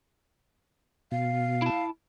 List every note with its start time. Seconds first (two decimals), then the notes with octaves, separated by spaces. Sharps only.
1.12 B2 F5
1.62 E4 A5